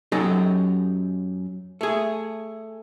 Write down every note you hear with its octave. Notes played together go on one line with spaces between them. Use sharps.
F#2 F#3 D#4 G4 A4 D#5
A3 G#4